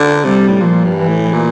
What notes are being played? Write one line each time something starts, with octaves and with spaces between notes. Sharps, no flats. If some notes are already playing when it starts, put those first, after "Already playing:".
Already playing: D3
C3 G3
A2
A#2 F3
G2
E3
A2
A#2